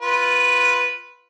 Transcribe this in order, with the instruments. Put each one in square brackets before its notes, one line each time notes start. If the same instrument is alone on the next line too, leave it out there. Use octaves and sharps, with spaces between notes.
[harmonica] F4 B4